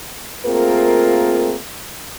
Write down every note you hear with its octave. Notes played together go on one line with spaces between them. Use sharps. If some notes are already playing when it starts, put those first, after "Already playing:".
A3 A#3 C4 F4 G#4 A#4